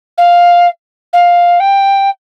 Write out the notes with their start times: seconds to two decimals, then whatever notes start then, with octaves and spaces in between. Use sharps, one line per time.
0.18 F5
1.13 F5
1.60 G5